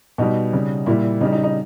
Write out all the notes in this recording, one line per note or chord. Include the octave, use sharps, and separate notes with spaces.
B2 G3 D#4
C#3 G3
A#2 G3 E4
C#3 G3 D#4
D#4
D#4